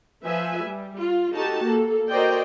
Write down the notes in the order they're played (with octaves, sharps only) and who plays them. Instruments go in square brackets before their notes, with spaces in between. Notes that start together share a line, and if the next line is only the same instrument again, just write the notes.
[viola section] F3 B4 E5 G#5
G3
F4
D#4 F#4 G4 A4 A5
A#3 A4
F#4 A#4 C5 D5 D#5 G5